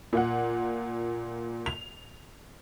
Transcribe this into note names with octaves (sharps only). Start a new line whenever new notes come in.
A#2 F4 F#5
F7